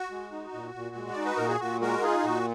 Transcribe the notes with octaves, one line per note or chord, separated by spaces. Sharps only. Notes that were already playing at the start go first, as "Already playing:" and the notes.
Already playing: F#4
G#3
D#4
A#2
A#2
G#3
D#4 D5
B4
A#2 A#4
G#4
A#2 F#4
G#3 F#4 A#4
D#4 F4 G#4
A#2 F#4